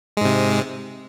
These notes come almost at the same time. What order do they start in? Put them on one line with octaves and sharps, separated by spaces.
G#3 G#2 C3